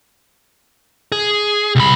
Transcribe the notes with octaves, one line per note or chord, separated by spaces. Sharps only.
G#4
C2 B5